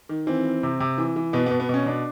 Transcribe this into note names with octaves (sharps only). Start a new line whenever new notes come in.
D#3
E3 C4
E3
C3
C3
E3
E3
B2 B3
B3
B2
B3
B2 C#4
B2 D4